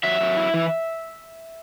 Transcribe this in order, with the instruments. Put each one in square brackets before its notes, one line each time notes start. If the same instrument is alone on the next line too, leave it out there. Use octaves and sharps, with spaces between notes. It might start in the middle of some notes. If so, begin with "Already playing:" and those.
[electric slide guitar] F#3 E5
F#3
E4
E3